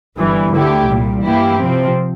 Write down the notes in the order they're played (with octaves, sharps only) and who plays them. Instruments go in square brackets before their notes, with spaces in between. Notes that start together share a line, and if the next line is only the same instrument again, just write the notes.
[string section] G1 G2 E3 G3
D2 D3 A3 E4 G4
C2 A#2 G3
G2 E3 A#3 E4 G4
C3 F3 C4